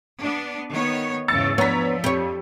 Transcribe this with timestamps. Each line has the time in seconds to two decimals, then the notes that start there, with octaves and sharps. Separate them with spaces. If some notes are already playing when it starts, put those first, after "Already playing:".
0.20 B3 D4
0.71 D#3 B3 C#5
1.28 E2 G#2 C#3 E6 A6 C#7
1.58 F3 B3 D4 C#5 A#5 B6
2.04 F2 G4 C#5